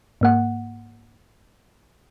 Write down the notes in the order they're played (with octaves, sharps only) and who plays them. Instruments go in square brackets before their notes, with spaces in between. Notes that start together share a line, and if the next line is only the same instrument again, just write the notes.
[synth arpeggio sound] G#2 A#3 F#5